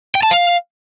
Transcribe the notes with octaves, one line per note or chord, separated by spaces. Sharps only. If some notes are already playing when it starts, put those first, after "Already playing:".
G5
A5
F5